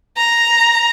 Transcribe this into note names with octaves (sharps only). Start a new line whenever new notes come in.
A#5